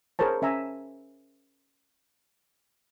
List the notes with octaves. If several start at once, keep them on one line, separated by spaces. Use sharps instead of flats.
G#4 A#4 C5 C#5 A5
C#4 E5 G#5 A#5 E6